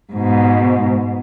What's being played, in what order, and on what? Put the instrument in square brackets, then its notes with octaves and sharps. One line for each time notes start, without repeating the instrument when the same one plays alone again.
[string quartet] G#2 B2